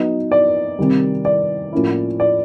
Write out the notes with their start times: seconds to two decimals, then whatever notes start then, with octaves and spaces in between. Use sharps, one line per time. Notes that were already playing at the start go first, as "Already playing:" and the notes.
Already playing: F#3 B3 D#4
0.32 D5
0.79 C3 D#3 G3
1.25 D5
1.72 A2 F3 A#3 C#4 E4
2.20 D5